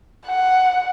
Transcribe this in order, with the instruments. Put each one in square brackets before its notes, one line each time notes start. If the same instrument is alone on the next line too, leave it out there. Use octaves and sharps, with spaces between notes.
[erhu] F#5